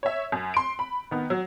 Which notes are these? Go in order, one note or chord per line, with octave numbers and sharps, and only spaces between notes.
C#5 E5
F#2
C6 D7
B5
D#3 B3
F#3